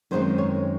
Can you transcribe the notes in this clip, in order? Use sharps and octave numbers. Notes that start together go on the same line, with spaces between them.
F#2 D#3 G#3 C4 C5
C#5